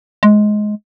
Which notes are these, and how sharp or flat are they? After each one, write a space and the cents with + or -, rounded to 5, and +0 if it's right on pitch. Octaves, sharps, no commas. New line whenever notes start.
G#3 +15